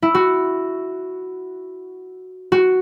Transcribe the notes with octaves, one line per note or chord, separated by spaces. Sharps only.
E4
F#4
F#4